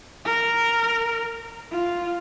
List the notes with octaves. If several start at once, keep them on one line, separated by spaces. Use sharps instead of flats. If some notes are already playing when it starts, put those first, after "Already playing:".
A#4
F4